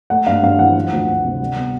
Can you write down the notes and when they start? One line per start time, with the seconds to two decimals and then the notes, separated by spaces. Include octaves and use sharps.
0.10 A3 F#5
0.27 G2 F5
0.43 G2 F5
0.59 E3 F#5
0.76 F3
0.92 D2
1.07 D2
1.24 C3
1.40 G3
1.56 B3